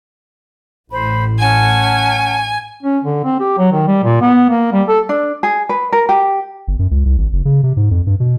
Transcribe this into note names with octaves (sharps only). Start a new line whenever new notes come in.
A1 A2 C5 B5
C#4 F#5 G#5 A5
C#4
D3
C4
G4
F#3
D#3
G3
A#2
B3
A#3
G3
A4
D4
G#4
B4
A#4
G4
G1
F#2
C#2
C2
G#1
F#1
C#3
C3
G#2
F2
G2
B2